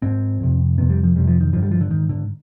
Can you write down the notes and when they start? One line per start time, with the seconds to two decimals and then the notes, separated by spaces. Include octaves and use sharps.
0.02 G#2 C4
0.40 F2 C3
0.78 F2 C3 B3
0.90 G3
1.03 F3
1.16 F2 C3 G3
1.28 F3
1.41 D#3
1.53 G2 D3 F3
1.63 G3
1.71 F3
1.81 D3
1.91 G#2 D#3
2.09 D3